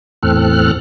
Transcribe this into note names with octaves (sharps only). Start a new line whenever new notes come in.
E2 A2 C4 A4 F6 F#6